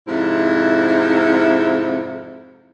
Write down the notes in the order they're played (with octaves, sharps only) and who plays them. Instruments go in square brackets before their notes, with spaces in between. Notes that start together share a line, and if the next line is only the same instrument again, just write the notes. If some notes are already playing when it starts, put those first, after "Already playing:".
[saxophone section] F2 G#2 C3 E4